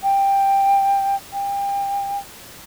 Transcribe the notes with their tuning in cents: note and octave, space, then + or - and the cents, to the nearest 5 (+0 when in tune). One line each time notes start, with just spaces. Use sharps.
G5 +10
G5 +30